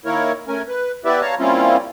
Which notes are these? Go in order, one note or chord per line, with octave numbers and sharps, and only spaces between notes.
D#3 A#3 E4 A#4 C#5
A3 C#4 A#4 G#5
B4
B3 E4 G4 B4 D5 E5
C#5 F5 A5 A#5
G3 A#3 C4 C#4 E4 F4